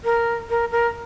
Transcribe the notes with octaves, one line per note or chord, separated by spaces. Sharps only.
A#4
A#4
A#4